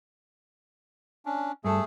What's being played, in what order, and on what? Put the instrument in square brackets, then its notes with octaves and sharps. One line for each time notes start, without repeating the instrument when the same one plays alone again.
[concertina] C#4 D4
[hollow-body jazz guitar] G2 A4 [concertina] A3 G#4